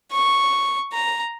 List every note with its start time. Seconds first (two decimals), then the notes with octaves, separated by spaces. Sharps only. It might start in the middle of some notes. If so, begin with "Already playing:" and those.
0.12 C#6
0.92 A#5